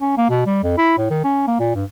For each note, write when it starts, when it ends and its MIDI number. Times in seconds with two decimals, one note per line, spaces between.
0.01 0.14 61
0.17 0.29 58
0.30 0.42 47
0.46 0.61 55
0.63 0.77 41
0.78 0.96 64
0.98 1.07 45
1.11 1.24 51
1.24 1.43 61
1.47 1.57 58
1.60 1.73 46
1.75 1.84 43